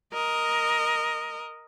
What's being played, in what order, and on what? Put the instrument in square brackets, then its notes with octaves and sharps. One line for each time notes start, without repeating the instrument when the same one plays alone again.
[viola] A#4 D#5